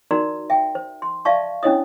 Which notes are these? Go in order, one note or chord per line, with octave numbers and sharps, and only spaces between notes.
D#4 F#4 A#4 D5 A#5 C6
E5 G5
C5
C6
D5 E5 F5 A5 C#6
C#4 D4 E4 C#5 D#5 D#6